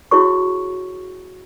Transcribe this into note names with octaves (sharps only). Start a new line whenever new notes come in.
E4 F#4 G#4 C#5 C#6